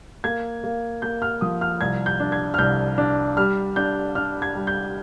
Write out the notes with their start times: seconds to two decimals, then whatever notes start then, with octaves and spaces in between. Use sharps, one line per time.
0.24 A#3 G#6
0.64 A#3
1.02 A#3 G6
1.22 F6
1.41 F3 D#6
1.61 F6
1.81 C2 G#6
2.06 G6
2.20 D4
2.32 G#6
2.54 F6
2.58 C2 G6
2.98 D4
3.37 G3 F6
3.76 D4 G6
4.15 D4 F6
4.42 G#6
4.55 G3
4.67 G6